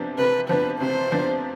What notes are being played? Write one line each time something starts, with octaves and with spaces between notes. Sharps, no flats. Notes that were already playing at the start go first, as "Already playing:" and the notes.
Already playing: C3 F3 B3 D4
C3 B4
F3 B3 D4 B4
C3 C5
F3 B3 D4